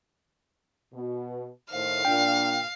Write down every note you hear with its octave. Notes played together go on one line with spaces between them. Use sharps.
B2
A2 D#3 C5 F5
A#2 D4 G5